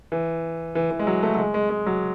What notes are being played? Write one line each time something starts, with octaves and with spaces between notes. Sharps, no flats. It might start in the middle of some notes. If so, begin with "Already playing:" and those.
E3
E3
E3
G#3
F#3
A3
F#3
G#3
G#3
G#3
F#3